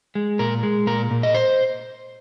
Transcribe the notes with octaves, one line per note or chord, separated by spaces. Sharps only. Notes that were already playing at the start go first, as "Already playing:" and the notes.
G#3
A#2 A#4
G#3
A#2 A#4
A#2
D#5
C5